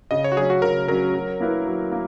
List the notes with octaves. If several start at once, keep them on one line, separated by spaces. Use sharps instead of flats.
C#3 D#5
C#5
F#4
F#3 C#4 G#4
F#4
C#3 A#4
F#3 C#4 A#4
F#3
A#3 E4 B4
F#3
A#3